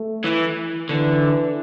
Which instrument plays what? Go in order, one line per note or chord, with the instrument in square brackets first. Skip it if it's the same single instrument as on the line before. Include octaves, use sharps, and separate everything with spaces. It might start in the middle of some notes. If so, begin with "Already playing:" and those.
Already playing: [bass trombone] A3
[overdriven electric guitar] E3
[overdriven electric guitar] D3 [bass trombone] E3